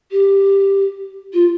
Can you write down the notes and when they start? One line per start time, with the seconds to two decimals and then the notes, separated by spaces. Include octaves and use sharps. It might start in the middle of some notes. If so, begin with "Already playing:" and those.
0.11 G4
1.33 F4